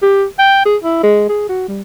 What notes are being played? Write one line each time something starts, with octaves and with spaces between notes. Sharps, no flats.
G4
G5
G#4
E4
G#3
G#4
F#4
G3